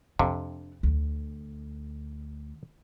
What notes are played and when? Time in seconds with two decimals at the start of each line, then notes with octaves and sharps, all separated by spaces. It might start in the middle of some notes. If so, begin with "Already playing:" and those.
0.19 F2 C3 D4
0.83 D2